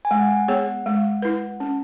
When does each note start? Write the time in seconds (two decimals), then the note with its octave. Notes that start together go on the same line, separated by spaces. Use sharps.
0.05 G#5
0.11 G#3 F#5
0.48 B3 G#4 C#5
0.86 G#3
1.22 E4 B4
1.60 C#4